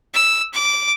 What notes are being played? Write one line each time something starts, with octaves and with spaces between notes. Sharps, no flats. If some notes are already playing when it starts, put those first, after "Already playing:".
E6
D6